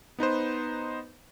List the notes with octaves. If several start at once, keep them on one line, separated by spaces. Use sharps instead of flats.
B3 D#4 B4 C5